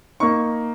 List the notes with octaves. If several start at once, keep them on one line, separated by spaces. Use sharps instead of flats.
A#3 D#4 C#6